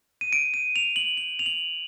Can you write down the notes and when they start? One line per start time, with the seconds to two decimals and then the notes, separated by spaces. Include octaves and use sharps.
0.21 D#7
0.33 D7
0.54 D#7
0.76 F7
0.96 F#7
1.17 F#7
1.39 F7
1.46 F#7